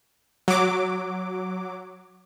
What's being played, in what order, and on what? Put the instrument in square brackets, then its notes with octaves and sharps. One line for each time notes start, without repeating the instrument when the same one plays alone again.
[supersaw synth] F#3 D6